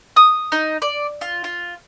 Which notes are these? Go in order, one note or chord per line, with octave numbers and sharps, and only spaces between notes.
D#6
D#4
D5
F4
F4